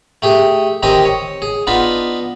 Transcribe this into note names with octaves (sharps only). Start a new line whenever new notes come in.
A3 G4 G#4
D#3 C4 G4 D#5 G#5
C#5
G#4
B3 D4 D#4 F4 B5